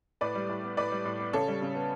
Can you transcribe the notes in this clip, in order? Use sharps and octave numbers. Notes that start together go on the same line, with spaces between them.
A2 B4 D5
G3
A2
B3
A2 B4 D5
G3
A2
B3
C#3 A4 C#5
G3
C#3
B3